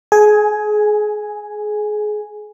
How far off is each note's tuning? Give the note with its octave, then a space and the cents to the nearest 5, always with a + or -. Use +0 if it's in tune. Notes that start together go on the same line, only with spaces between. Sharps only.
G#4 +25 G#5 +0